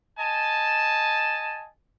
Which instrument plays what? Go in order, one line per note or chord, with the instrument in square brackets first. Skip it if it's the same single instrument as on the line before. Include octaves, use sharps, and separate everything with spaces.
[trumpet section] D#5 G#5 A5